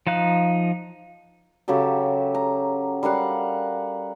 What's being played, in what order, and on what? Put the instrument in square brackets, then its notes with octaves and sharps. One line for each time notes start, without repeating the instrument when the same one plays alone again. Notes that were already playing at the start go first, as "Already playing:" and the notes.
[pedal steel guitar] F3 D#4 F5 F#6
[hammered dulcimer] C#3 F#3 G4 A4
A#5
G3 A#4 F5 F#5